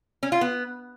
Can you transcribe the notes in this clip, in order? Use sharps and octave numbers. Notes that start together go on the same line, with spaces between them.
C#4
F4
B3